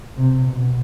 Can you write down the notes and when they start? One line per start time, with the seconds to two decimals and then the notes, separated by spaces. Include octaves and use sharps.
0.17 C3
0.47 B2